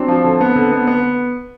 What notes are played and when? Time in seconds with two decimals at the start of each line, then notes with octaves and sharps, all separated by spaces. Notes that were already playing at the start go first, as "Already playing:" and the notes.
Already playing: F#3 C4 D4
0.08 F3
0.24 D3
0.41 B3
0.56 D3
0.72 B3
0.87 B3